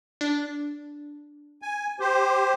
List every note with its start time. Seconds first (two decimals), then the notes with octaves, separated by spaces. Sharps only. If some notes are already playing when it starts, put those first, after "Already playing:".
0.21 D4
1.62 G#5
2.00 G4 C5